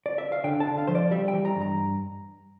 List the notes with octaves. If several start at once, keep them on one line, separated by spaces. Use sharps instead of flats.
D5
E5
F5
D3 G5
A5
D3
F5
F3 C5
D5
G3 E5
G5
E3
A#5
G2
A#5